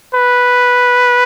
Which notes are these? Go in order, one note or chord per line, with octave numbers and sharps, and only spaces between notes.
B4